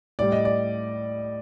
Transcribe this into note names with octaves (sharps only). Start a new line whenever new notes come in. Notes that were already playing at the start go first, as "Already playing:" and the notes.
A2 G3 D5
D#5
D5